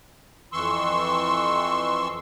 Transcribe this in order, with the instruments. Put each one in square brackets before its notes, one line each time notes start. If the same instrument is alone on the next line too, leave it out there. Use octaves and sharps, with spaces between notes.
[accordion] F2 E3 C6 C#6 E6